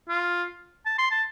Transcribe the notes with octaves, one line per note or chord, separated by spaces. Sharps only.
F4
A5
C6
A5